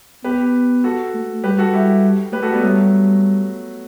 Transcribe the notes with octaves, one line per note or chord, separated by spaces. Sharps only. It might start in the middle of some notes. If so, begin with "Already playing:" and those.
B3 G4 B4
F#4 A4
A3
G3 G4 B4
F#4 A4
G3 E4 G4
A3 G4 B4
F#4 A4
G3 B3
F#3 G3 A3